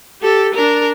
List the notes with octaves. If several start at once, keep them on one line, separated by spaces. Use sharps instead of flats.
G4 A4
D4 A#4